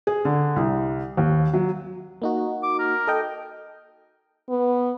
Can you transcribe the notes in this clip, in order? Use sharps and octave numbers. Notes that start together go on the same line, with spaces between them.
G#4
D3
C2
D#2
F#3
A#3 D#4 F#4
D6
A#4
A4 D#5 G5
B3